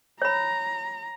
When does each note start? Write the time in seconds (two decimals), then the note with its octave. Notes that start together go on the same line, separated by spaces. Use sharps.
0.22 C#5 A#5 B5